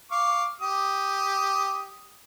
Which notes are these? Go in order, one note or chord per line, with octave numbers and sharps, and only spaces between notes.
F5 C#6 D6
G4 D#6